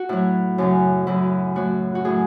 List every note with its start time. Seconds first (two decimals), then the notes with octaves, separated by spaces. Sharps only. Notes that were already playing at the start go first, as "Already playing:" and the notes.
Already playing: F#4
0.09 A2 F#3 E4
0.58 F#2 C#3 F#3
1.07 F#2 C#3 F#3 E4
1.56 A2 F#3 F#4
1.95 F#4
2.05 A2 F#3 G#4